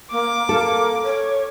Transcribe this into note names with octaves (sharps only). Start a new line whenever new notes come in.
A#3 D6
A#3 A4
C#5